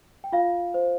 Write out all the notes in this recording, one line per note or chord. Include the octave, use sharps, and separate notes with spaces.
G5
F4 F5
C5